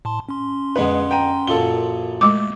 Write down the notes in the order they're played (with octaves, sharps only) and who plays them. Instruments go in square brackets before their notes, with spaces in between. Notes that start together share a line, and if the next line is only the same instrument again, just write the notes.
[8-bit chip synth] A2 A5 C6
C#4 C6
[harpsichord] F2 D3 B3 [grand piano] G#3 B4
[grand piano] G5 A#5 D#7
[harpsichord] F#2 A#2 F3 [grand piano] A4 G7
[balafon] G#3 D6 [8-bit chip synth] A3